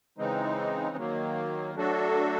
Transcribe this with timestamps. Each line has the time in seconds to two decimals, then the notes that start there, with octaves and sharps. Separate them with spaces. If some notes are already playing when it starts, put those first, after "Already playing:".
0.18 C#3 E3 G#3 C4 D#4
0.96 D#3 F#3 A#3
1.75 F#3 A3 D4 F#4 A4